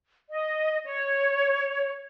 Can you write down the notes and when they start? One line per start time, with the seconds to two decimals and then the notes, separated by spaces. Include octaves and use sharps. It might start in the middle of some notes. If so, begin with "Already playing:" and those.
0.29 D#5
0.85 C#5